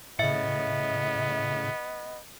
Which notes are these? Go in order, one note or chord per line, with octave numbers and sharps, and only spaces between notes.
A2 C#3 B3 D#5 E5 C#7